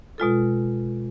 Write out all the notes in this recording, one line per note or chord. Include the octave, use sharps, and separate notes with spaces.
B2 G#3 F4 A4